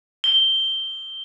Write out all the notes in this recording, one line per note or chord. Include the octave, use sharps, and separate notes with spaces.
G7